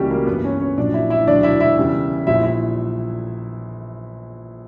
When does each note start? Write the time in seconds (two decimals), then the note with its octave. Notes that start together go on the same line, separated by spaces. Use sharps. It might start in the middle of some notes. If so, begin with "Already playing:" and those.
Already playing: C#2 C#3 E3 G3 A#3 C#4 F#4 G4
0.10 A#3 A#4
0.27 G2 E3 A#3 B3 B4
0.44 C#4 C#5
0.61 C#4 C#5
0.78 A#1 A#2 F#3 D4 D5
0.94 E4 E5
1.10 E4 E5
1.27 E1 D2 D3 F#3 D4 D5
1.43 E4 E5
1.60 E4 E5
1.77 E2 C#3 G3
2.27 A#1 A#2 G3 E4 E5
2.43 E4 E5